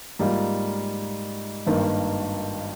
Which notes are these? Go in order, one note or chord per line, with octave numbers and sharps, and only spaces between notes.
G#2 G3 A#3 F4
G#1 G2 D#3 A#3